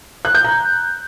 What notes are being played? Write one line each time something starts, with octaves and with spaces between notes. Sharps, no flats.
F#6
G6
A#5